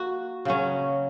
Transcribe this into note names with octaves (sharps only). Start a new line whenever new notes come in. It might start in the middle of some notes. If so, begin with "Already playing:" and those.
Already playing: A#3 F#4
C#3 F#3 C#4